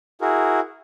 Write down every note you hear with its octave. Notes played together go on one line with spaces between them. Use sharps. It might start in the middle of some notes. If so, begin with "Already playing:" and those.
E4 F#4 G#4 A#4